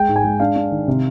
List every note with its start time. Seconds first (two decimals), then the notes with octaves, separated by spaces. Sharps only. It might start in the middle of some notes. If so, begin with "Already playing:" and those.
Already playing: G#3 G5
0.08 G#2
0.16 G#5
0.24 G#3
0.40 D4 F5
0.56 D4
0.71 D#3
0.88 C3